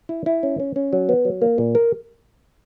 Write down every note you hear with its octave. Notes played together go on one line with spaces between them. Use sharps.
E4
E4
C#4
C#4
C#4
F#3
B3
F#3
A#3
A#2
A#4